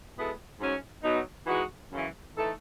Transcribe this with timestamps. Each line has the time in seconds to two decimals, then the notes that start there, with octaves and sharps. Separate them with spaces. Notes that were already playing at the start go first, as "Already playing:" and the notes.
0.15 B2 G#3 B3 E4 A4
0.59 G#2 F#3 C#4
1.04 B2 F#3 B3 D#4
1.47 E3 G#3 D#4 F#4
1.92 F#2 C#3 E3
2.35 E3 A3 D#4 A4